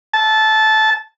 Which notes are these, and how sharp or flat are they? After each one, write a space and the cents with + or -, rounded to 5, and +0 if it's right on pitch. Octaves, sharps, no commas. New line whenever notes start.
A5 -15